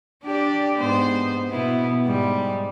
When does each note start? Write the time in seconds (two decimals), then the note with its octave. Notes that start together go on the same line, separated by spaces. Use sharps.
0.24 D4 G4 D5
0.78 G#2 B3 C5
1.50 B2 B3 E4
2.06 G#2 G3